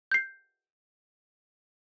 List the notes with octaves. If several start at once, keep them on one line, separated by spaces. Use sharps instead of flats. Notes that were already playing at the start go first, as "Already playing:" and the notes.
G6 C7